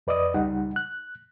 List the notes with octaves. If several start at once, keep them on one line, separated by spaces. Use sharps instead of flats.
F2 B4 D5 D#5 D#6
C#2 G3 D#4 F#5
F#6